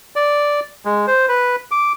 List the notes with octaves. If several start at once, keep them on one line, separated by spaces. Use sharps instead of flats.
D5
G#3
C5
B4
D6